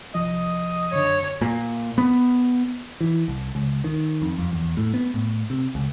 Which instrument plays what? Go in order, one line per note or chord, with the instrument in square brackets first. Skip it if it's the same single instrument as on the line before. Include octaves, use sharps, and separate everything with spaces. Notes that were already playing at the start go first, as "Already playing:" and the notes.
[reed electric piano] C2 F3 [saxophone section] D#5
[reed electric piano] F#2 D3 [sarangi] C#5
[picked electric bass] A#2
B3
E3
C2
C#2
D#3
F2
F2
E2
A2
B3
A2
C3
C#2